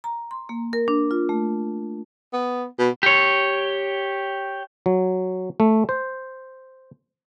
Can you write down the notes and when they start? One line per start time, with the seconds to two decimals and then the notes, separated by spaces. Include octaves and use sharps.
0.04 A#5
0.31 C6
0.49 A#3
0.73 A#4
0.88 D4
1.11 F4
1.29 A3
2.33 B3
2.79 B2
3.03 G4 C#5
4.86 F#3
5.60 A3
5.89 C5